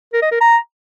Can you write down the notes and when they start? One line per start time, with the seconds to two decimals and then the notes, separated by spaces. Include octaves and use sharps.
0.13 A#4
0.22 D#5
0.32 A#4
0.41 A#5